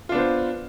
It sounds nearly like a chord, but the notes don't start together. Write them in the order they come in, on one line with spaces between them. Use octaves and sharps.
F4 D4 B3 C5